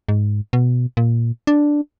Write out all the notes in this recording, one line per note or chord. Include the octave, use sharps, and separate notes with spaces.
G#2
B2
A#2
D4